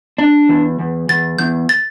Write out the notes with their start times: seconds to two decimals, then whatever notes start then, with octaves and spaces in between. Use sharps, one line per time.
0.18 D4
0.49 E2
0.79 E2
1.09 E2 A6
1.38 E2 G6
1.69 A6